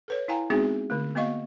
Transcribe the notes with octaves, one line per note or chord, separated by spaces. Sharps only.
A4 B4 C#5
E4 F5 G5 G#5 A#5
G#3 B3 C4 D#4 F#4 G#4
D3 A3
A#3 B3 F#4 D#5 F5 C#6